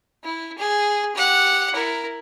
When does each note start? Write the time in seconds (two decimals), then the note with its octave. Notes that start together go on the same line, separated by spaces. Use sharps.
0.23 E4
0.58 G#4
1.15 G4 F#5
1.74 E4 A#4